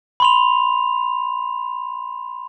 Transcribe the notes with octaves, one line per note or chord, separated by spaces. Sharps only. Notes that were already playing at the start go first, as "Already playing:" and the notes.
B5 C6 F7